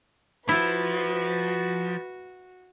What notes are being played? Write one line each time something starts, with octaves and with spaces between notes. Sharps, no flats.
F3 E4 F#4 B4